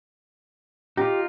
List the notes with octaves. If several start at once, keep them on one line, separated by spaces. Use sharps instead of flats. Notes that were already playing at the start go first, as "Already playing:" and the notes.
D#4 F4 G4